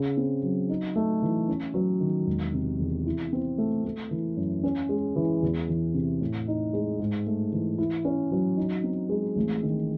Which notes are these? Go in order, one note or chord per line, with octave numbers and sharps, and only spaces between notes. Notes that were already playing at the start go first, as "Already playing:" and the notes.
Already playing: C#3
C4
F#3
D#4
A3
E3
C#4
F#3
D#3
E1
C3
E2
E4
C4
A3
A3
E3
F#2
C#4
G#3
E3
E2
E3
C3
A2
D#4
G#3
G#2
A3
E3
E4
C#4
F#3
D#4
C4
G#3
A1
D#3